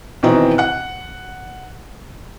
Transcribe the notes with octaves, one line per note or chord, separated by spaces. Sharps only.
B2 D#3 E3 C4
F#5 F#6